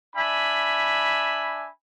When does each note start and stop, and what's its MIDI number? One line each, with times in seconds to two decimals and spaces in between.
0.16 1.69 62
0.16 1.69 76
0.16 1.69 80
0.16 1.69 83